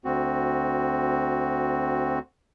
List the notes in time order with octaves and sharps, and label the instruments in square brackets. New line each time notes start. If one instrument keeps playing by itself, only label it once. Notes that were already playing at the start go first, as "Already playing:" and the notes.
[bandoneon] D2 C4 F#4